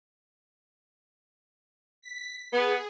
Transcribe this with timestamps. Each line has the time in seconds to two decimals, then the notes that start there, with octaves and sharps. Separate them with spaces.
2.02 B6
2.52 B3 G#4